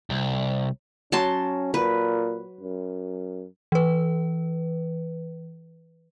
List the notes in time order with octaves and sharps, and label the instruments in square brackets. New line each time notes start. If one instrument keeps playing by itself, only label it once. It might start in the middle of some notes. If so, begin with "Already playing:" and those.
[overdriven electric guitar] C2
[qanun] F#3 A5 C6 [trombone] C#4
[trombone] A#2 [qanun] B4
[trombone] F#2
[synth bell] E3 B4